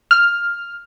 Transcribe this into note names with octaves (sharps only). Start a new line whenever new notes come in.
F6